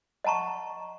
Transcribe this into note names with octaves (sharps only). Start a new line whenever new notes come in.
D#5 F#5 A5 A#5 C#6